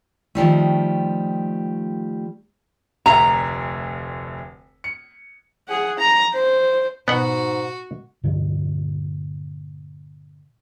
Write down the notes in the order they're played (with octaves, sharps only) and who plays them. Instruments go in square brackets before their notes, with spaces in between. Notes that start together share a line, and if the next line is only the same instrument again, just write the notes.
[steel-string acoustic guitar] D#3 F3 G3 A3
[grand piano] F1 D2 E5 [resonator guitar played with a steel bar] A#5
[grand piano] C#7
[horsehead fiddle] G#4 F#5
A#5
C5
[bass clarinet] G#2 [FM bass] B2 [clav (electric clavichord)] B3 F#5 [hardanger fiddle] F#4
[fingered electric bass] G2 A#2 D3